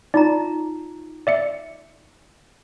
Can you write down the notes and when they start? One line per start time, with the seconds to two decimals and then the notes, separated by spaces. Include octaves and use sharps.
0.14 D#4 F4 D5 A#5
1.27 D5 E5 C#7